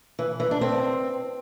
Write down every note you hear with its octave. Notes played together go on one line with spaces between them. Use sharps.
E3
E3
D4
C4